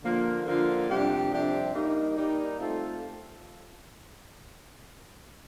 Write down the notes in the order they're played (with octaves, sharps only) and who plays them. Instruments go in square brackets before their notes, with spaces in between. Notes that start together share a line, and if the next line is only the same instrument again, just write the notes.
[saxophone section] D3 F3 A#3 F4
D3 F3 A#3 F4
F2 C3 G3 D4 G4
F2 C3 G3 D4 G4
G3 A#3 D#4
G3 A#3 D#4
A3 C4 F4 A4